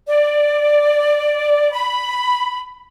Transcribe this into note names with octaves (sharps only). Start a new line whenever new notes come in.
D5
B5